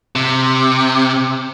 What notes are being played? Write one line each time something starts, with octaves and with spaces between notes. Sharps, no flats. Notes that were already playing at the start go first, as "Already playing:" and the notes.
C3